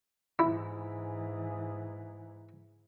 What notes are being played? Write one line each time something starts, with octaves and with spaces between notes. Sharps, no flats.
G#2 E3 E4